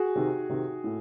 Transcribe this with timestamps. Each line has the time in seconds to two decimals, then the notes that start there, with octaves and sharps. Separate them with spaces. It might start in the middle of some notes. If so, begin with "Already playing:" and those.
Already playing: F#4 G#4
0.16 C3 D#3
0.49 C3 D#3
0.84 A2